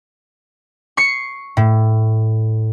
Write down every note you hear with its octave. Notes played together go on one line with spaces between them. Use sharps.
C#6 C7 C#7
A2